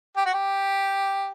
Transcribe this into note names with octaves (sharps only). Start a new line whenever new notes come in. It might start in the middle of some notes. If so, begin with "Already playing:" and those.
G4
F#4
G4